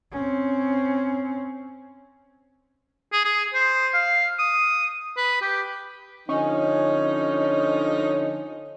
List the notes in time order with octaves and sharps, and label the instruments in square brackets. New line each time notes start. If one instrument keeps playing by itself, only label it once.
[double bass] C4 C#4
[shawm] G#4
G#4
C5
F5
D#6
B4
G4
[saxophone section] D3 F3 D#4 [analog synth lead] C#4